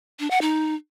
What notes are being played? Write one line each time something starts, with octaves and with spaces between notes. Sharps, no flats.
D4
F#5
D#4